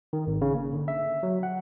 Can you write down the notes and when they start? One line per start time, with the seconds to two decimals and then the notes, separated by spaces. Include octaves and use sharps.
0.13 D#3
0.27 G#1
0.41 C#3
0.54 A#3
0.73 D3
0.88 E5
1.23 F#3
1.43 F#5